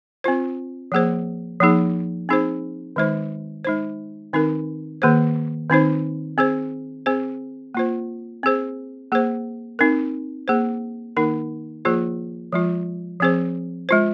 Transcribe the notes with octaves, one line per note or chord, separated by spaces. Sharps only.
C4 F4 C5
F3 A#3 G#4 C5
F3 A#3 D#4 G#4
C4 D#4 G#4 C5
D#3 G#3 D#4 C5
G#3 D#4 C5
D#3 C4 D#4 A#4
D#3 A#3 G#4 C5
D#3 C4 D#4 C5
C4 G#4 C5
C4 G#4 C5
A#3 F4 C5
C4 G#4 C5
A#3 G#4 C5
C4 D#4 A#4
A#3 G#4 C5
D#3 A#3 D#4 A#4
F3 A#3 F4 G#4 C5
F3 G#3 F4
F3 C4 G#4 C5
G#3 F4 C5